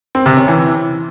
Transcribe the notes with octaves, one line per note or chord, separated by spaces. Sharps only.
C4
C3
C#4
E3